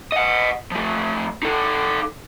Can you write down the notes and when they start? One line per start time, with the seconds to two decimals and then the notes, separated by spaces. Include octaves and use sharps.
0.12 D#5 F#5
0.71 F3 A3
1.43 D#4 A4